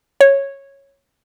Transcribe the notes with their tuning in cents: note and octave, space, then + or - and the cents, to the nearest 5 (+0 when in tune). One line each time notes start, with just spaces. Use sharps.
C#5 -10